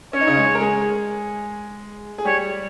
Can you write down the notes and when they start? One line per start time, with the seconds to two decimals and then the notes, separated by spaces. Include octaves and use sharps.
0.13 C#4 C#5
0.21 D#4
0.27 C#3 C#4
0.37 G#3 G#4
0.55 A#4
0.60 G#3 G#4
2.18 G#4
2.25 G3 G4 C#5